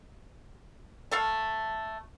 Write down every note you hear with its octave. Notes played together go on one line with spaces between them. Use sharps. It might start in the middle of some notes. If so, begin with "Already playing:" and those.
A3 A4 F5